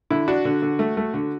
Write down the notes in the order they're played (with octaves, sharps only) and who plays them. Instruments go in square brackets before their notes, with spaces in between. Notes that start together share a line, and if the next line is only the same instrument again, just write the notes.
[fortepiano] D3 E4
D4 F#4
D3
D3
A3
A3
D3